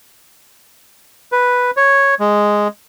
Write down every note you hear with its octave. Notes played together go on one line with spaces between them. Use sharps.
B4
C#5
G#3